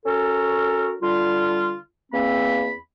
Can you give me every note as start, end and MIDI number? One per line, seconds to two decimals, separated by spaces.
0.06 0.94 61
0.06 0.94 66
0.06 0.94 69
0.06 0.94 70
1.02 1.77 50
1.02 1.77 55
1.02 1.77 65
2.12 2.72 40
2.12 2.72 58
2.12 2.72 60
2.12 2.72 83